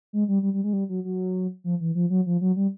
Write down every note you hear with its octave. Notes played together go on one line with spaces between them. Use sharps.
G#3
G3
G3
G3
G#3
G3
F#3
F#3
F3
E3
F3
F#3
F3
F#3
G3